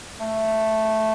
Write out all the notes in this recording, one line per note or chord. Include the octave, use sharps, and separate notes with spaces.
A3